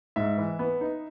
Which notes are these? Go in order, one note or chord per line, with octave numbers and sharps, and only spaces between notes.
G#2 E5
E3
B3
D#4